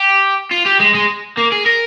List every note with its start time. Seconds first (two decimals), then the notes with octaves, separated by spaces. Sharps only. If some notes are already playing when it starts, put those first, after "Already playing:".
Already playing: G4
0.51 F4
0.66 G4
0.80 G#3
0.94 G#3
1.37 A#3
1.52 G#4
1.66 A#4